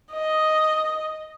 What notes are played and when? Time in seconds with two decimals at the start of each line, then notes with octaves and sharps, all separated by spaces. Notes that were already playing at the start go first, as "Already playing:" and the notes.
0.11 D#5